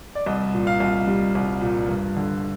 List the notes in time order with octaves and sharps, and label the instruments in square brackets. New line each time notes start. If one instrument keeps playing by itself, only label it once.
[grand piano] D5
C2 D#5
A#2
F5
C2
G3
C2
A#2
G2
D3